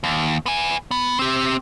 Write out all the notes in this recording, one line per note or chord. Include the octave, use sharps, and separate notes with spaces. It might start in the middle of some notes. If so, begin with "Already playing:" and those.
D#2
B3 G#5
B3
C4 G4